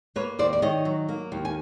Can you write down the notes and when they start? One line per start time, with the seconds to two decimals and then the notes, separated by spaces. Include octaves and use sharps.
0.16 A#3 B4 C#5
0.39 D#2 C5 D5
0.53 D5
0.62 D#3 C#5 D#5
0.85 F#3
1.09 A#3
1.32 D#2
1.45 G#5